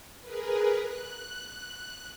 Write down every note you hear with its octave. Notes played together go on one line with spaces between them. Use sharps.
G#4 A#4 B4
F#6